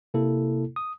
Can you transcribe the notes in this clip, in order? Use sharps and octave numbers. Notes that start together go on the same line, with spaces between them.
C3 A#3 E4 A4
D#6